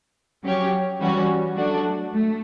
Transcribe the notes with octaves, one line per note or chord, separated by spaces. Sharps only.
F#3 C#4 G4 C#5
E3 G3 C#4 F#4
F#3 A3 D4 F#4
A3